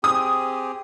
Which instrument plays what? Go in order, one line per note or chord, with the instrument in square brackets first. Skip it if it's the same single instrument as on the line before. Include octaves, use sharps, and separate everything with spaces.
[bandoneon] C4 G4 G#4 [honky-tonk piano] D#6